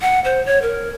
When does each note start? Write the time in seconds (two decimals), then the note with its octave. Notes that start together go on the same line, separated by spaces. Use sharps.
0.02 F#5
0.25 C5
0.46 C#5
0.62 A#4